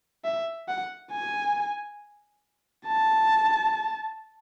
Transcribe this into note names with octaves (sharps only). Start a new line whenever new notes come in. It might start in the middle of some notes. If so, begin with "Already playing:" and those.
E5
F#5
G#5
A5